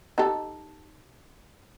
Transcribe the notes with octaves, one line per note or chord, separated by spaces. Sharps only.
D#4 G4 A4